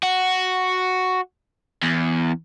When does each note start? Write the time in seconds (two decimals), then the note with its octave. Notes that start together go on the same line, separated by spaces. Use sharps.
0.03 F#4
1.83 E2